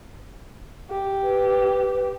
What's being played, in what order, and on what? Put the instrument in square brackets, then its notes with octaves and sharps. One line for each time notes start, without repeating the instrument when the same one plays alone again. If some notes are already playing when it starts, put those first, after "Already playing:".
[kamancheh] G4
[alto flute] B4